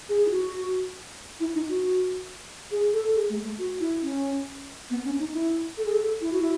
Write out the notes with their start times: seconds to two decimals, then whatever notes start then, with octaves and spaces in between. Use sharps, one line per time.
0.09 G#4
0.26 E4
0.31 F#4
1.40 E4
1.55 D#4
1.69 F#4
2.71 G#4
2.93 A4
3.15 G#4
3.29 A3
3.45 A3
3.58 F#4
3.80 E4
4.02 C#4
4.90 B3
5.05 C#4
5.19 D#4
5.34 E4
5.78 A4
5.85 G#4
5.93 A4
6.21 E4
6.32 F#4
6.42 E4